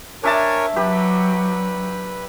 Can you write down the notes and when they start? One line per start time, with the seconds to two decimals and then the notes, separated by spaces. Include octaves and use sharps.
0.24 D4 A#4 C#5 E5 G#5 A5
0.76 F#3 G4 B4